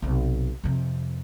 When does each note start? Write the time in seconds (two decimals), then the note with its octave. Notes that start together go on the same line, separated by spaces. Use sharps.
0.02 B1 C3
0.64 F2 C3